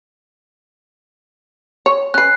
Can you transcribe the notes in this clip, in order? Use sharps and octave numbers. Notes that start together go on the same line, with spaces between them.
C#5
C#4 B4 F#6 C7